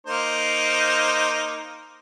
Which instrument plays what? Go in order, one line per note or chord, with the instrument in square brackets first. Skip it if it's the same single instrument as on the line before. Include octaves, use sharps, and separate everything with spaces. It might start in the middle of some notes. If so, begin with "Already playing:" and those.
[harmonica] A#3 D#4 C5